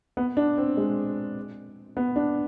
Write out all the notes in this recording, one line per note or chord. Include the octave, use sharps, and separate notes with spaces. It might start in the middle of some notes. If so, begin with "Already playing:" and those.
B3
D4
C4
G#3
B3
D4